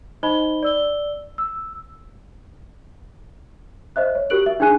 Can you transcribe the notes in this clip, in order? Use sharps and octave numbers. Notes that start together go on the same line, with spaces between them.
D#4 C5 D#5 B5 G7
D5 E6 G7
E6
C5 D#5 E5 F#6
C#5
F#4 G4 A#4 F#6 D7 F#7
E5
D4 D#4 G#4 G#5 F#6 D#7